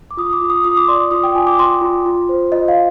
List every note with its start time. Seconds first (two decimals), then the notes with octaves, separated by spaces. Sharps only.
0.11 D6
0.17 F4 D#6
0.33 D6
0.41 F4
0.50 D#6
0.64 F4 D#6
0.77 D6
0.88 D5 C6
1.00 D6
1.11 F4 D#6
1.23 G5
1.35 F4 G#5
1.47 D6
1.58 F4 C6
1.81 F4
2.06 F4
2.29 C5
2.52 F4 D#5
2.68 F5